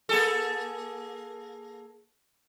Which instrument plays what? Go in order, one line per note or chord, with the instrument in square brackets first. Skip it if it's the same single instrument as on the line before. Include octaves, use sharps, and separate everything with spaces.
[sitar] A#3 G#4 A4